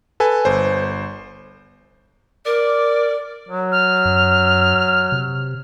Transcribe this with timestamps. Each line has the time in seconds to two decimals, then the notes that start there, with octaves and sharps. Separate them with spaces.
0.20 A4 B4 G#5
0.45 G1 C5
2.46 A#4 D5
3.49 F#3
3.72 F6
4.05 F#2
5.12 C3